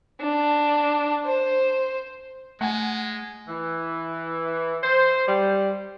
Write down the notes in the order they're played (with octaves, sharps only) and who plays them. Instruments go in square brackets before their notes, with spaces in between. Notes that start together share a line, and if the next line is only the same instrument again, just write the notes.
[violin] D4
C5
[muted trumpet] G#3 [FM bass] A3 [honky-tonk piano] F#5 G#5
[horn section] E3
C5
G3